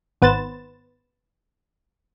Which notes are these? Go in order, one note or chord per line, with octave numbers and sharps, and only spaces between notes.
G#1 B3 B4 C5 A6 E7